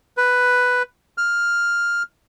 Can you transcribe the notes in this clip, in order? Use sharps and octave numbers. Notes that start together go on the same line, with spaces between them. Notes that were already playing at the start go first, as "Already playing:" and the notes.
B4
F6